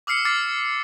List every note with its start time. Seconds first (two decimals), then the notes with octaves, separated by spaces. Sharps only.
0.07 D6 E6 F6 C7 C#7
0.25 D6 F6 A6 C7